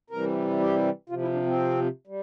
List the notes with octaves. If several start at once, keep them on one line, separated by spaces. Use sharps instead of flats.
C3 E3 G3 A#4
G4
C3 F3 F4
E4
D4
C4
G3